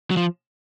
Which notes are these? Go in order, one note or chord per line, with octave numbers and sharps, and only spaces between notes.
F#3
F3